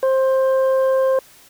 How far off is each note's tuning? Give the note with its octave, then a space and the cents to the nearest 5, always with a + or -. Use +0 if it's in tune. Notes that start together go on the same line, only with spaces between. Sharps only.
C5 +15